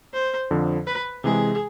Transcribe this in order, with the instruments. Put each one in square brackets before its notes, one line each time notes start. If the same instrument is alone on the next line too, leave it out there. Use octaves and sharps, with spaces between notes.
[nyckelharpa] C5
[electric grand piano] F2 D3 F3
[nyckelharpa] B4
[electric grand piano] C3 E3 G#3 [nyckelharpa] G#4